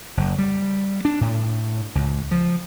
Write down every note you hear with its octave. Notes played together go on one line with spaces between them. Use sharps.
F#1
G3
D4
A2
C#2
F3